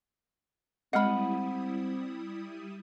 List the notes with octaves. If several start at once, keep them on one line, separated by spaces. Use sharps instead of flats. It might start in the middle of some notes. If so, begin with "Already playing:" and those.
G3 G#3 C4 E4 D#5 F#5 B5 D#6